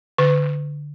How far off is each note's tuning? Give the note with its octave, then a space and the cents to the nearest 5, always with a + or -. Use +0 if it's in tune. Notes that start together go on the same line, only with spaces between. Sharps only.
D3 +0 B4 +30